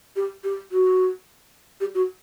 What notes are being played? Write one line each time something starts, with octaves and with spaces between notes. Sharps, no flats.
G4
G4
F#4
G4
F#4